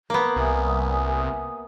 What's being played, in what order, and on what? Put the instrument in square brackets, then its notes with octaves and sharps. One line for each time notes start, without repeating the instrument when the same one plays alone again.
[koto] A#3 B3
[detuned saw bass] C2 [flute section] E5 G#5 D#6